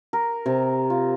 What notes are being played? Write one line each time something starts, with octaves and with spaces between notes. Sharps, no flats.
A#4
C3
F4